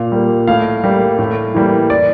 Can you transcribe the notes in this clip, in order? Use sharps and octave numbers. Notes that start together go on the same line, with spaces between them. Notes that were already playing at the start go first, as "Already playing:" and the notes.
Already playing: A#2 F5
G3 A#3
A2 F5
G3 A#3
A2
E3 G3 A#3
D5